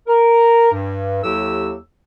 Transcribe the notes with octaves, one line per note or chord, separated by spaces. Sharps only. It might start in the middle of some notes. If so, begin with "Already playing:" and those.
A#4
G2
D#2 F#3 E4 G4 A4 E6